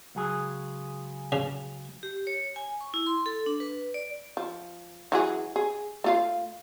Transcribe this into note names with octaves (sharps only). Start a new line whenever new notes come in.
C#2 F#3 G#4
C#3
G4
C#5
G#5
C#6
E4
C6
A4
D4
B4
D5
F3
E3 F#3 G#4
G#4
A3 F4 F5